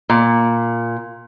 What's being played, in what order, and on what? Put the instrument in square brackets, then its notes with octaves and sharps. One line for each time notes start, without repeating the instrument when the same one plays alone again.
[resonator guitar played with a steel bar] A#2